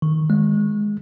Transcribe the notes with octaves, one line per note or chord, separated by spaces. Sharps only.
D#3
G#3